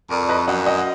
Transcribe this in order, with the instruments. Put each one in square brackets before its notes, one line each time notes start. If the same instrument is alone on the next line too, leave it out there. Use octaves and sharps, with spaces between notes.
[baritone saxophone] F2 [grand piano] A#4 D5
[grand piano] D5
B4 D#5
[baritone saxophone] F#2 [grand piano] D#5 F#5
[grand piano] D#5 F#5